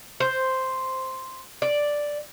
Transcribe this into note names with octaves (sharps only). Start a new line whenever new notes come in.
C5
D5